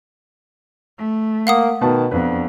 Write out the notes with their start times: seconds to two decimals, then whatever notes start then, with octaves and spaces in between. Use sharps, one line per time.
0.98 A3
1.47 A#3 F5 F#5 D#6
1.81 B2 D#3 B4 A5
2.11 F2 B3 D4 B4